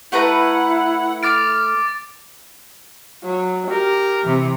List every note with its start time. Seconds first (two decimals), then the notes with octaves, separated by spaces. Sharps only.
0.12 A3 E4 B4 F#5 A#5
1.23 D6 F6 A6 D7
3.24 F#3
3.71 G4 A#4
4.22 C3 E3